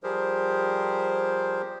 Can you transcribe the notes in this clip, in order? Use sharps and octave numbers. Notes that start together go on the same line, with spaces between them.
F3 G3 G4 G#4 A#4 C5